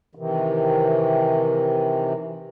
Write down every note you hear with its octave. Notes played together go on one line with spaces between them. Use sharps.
C3 D#3 E3